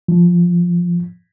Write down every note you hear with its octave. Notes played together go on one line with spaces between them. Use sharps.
F3